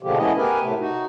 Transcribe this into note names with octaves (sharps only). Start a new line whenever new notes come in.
B2 D3 F3 G#3 A#3 G4
A3 B3 C#4 E4 D#5
B3 G4 A#4 B4 G#5
A2 C3 A3
D#4 F#4